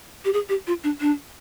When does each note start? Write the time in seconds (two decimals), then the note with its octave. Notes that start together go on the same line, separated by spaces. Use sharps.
0.25 G4
0.33 G#4
0.49 G4
0.67 F4
0.84 D4
1.01 D4